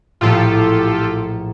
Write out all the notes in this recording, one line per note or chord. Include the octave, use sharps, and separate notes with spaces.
A#1 A2 F4 G4 A4